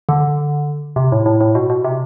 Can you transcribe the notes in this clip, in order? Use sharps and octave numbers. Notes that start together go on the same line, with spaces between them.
D3
C3
A2
A2
A2
B2
B2
C3